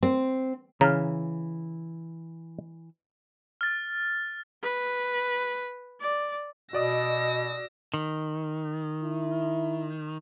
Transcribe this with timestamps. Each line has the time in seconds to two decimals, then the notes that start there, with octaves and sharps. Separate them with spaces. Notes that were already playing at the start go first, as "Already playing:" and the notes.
0.03 C4
0.81 C#3 E3 A#5 F6
3.61 F6 A6
4.63 B4
6.01 D5
6.73 B2 F#4 D5 D#5 D#6 E6 A#6
7.94 D#3
9.04 E4